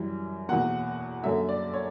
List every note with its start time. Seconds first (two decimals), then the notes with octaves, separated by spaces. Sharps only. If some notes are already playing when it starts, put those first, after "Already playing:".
Already playing: F#2 E3 G3
0.49 E2 B2 A#3 F#5
1.24 F#2 D3 A#3 E5
1.49 D5
1.74 C#5